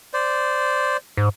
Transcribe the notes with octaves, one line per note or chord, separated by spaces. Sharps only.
C5 D5
G#2